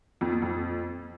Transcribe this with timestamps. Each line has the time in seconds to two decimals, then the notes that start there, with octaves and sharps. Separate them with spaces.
0.21 F2
0.32 A#2
0.42 F2